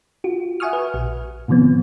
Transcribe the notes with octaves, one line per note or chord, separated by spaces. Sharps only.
F4 F#4
E5 F#5 G#5 C#6 D#6 F6
B4
A#1
A2 C3 D#3 F3 B3 C4